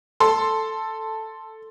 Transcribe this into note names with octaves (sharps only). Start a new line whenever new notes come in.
A4 C6